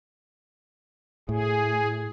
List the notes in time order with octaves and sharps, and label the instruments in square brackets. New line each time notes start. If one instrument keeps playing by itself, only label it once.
[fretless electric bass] A2 [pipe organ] G#4